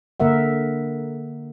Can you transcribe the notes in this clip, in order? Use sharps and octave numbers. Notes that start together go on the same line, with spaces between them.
D3 A#3 A#4 E5 F#5